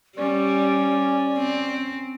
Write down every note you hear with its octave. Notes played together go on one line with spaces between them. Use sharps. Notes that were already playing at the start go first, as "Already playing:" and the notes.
G3 C#4 D5
C4